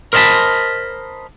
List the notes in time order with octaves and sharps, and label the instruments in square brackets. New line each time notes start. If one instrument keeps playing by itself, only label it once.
[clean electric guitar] A#4 C5 D#5 F5 A5 B5